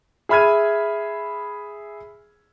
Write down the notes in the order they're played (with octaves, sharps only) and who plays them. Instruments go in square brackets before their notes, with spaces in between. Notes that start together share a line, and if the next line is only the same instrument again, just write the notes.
[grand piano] G#4 E5 B5 F6 G#6 D#7